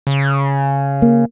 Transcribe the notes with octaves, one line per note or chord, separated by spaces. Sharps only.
C#3
A#3